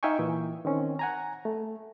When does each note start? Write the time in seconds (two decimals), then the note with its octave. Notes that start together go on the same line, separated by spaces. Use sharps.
0.03 D#4 E5 F5 G5 G#5 C#6
0.19 A#2 E3
0.65 D#3 C4 C#4
0.99 F#5 G#5 A#5
1.45 A3